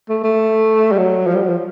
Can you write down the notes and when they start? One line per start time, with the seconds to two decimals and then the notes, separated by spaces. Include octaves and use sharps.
0.09 A3
0.24 A3
0.92 G3
0.98 F#3
1.27 F3
1.35 G3
1.42 F#3
1.49 F3